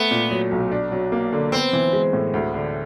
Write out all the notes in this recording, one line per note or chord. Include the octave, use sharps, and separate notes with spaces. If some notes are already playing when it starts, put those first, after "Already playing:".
Already playing: A3 B3
A#2
F#3
B1
D4
F#3
A#3
D3
B3 C4
E3
G#3
A2
D2
D3